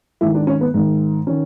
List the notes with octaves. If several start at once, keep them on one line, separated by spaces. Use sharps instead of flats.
G#2 D#3 E4
D4
C#4
B3
G#2 D#3
D#3 C#4